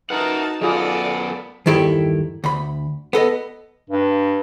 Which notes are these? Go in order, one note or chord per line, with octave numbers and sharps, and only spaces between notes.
D#4 F#4 A#4 B4 F#5 A5
F#2 B3 F4 G#4 A4 D5 D#5
E2 G2 D#3 E4 G4 A4
D2 B5
B3 A4 D#5
G2